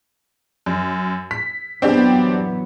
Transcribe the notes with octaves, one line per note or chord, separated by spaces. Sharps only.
F#2
B6
E3 F#3 B3 C4 D4 G4